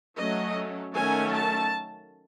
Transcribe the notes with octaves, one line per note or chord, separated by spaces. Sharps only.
F#3 A3 C#4 D#5
D#3 F#3 A3 C#4 G#5
A5